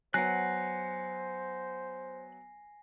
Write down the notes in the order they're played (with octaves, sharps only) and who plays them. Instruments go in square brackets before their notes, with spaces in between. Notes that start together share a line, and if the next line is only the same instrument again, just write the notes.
[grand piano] F#3 B3 [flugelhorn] C5 [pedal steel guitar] F#5 F#6 [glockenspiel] G#5 A#6 C7